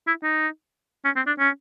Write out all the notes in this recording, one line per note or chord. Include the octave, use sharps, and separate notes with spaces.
E4
D#4
C#4
C4
D4
C#4